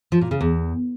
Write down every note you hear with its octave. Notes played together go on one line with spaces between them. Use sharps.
F3
A#2
C#3
E2